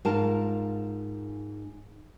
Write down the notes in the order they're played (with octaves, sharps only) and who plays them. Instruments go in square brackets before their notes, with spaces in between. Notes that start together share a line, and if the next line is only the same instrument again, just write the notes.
[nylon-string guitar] G#2 F4 A#4 F5 A5